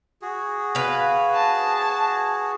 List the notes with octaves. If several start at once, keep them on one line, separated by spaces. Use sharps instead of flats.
F#4 G#4
B4 F5
A5